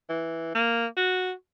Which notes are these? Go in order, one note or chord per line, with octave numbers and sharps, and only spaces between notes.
E3
A#3
F#4